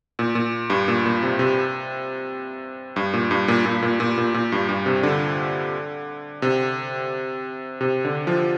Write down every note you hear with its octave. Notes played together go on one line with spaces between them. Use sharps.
A#2
A#2
G2
A#2
A#2
C3
C3
G2
A#2
G2
A#2
A#2
A#2
A#2
A#2
A#2
G2
G2
C3
D3
C3
C3
D3
F3